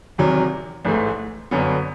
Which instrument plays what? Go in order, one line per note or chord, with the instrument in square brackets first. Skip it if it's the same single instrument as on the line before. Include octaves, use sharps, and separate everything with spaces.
[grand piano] E2 C3 D#3 F#3
A1 G#2 E3 A3
G1 F#2 D3 F#3 B3